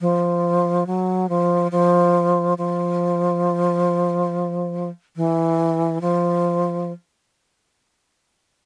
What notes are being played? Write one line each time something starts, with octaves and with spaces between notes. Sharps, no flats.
F3
F#3
F3
F3
F3
E3
F3